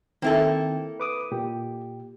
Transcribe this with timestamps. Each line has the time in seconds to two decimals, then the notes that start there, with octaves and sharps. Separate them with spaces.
0.22 D#3 A#3 C4 E4 A4 G5
1.00 B4 D6 D#6
1.32 A#2 G4